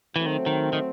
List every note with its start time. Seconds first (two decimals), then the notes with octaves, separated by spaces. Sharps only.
0.16 E3 F#3 A3 C4
0.26 D#3
0.46 D#3
0.73 D#3